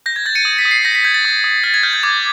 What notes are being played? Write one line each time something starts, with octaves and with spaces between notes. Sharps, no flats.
G6 A#6
G#6
G6 A6
C#7 D#7
D#6
B6
D#6
C7
G6 A#6
B6
G6 G#6
A6
D#6
D#6
F6 A6
G#6
F6 G6
G6
D6 G#6